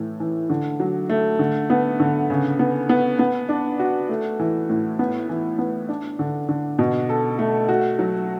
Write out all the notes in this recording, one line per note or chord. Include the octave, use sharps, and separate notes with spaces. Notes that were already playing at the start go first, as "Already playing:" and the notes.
Already playing: A2 E3
E3
D3
F#3
A3
D3
B3
D3
C#3
B3
B3
B3
D4
F#4
A3
E3
A2
B3
E3
B3
D4
D3
D3
B2
A4
A3
F#4
F#3